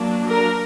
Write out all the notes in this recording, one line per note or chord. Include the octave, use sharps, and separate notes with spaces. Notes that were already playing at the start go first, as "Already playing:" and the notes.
Already playing: F#3 A#3 D4
A#4